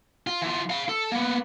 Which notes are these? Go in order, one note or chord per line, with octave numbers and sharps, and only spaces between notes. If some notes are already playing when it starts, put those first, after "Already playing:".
F4
E3 F4
F5 B5
A4
A#3 B3